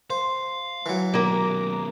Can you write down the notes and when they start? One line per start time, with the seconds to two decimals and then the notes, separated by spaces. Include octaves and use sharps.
0.10 C5 F5
0.86 E3 F#3
1.14 B2 D#3 A#3 A#4